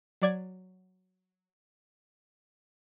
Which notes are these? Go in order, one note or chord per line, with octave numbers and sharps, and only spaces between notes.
F#3 D5 G#6